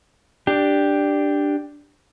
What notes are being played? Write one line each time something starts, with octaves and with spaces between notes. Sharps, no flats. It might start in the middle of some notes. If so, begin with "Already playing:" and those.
D4 G4